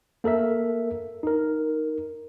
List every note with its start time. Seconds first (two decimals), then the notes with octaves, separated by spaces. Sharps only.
0.24 A#3 A4 A#4 E5
1.23 D#4 A#4